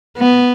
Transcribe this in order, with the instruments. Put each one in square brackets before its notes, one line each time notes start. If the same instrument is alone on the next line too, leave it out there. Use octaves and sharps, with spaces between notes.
[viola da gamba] B3